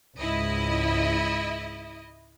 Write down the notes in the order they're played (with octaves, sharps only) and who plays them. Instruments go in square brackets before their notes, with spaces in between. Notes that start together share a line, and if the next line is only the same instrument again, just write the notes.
[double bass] C#2 G#2 [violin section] E4 D#5